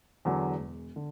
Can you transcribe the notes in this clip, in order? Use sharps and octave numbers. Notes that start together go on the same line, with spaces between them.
E2 D3 F#3
E1
D3